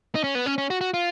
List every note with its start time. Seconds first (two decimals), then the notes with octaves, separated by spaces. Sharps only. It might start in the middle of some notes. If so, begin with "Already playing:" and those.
0.15 D#4
0.24 C#4
0.35 B3
0.46 C#4
0.58 C#4
0.70 F#4
0.81 F#4
0.94 F4